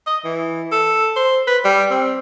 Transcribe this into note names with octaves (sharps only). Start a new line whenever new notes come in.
D#5
E3
A4
C5
B4
G3
C4